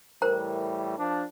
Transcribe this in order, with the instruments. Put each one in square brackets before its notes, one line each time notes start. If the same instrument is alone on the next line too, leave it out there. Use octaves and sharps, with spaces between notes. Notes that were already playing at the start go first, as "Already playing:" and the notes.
[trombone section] A2 E3 G3 [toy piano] A#4 C5 A#5
[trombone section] F3 D4